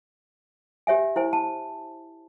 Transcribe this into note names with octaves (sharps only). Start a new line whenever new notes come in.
G4 C#5 E5 G#5
E4 C5 G#5
A5